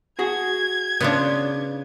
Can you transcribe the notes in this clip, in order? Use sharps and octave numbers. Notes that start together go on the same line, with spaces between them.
F#4 G#4 G#6
C#3 B3 D4 F4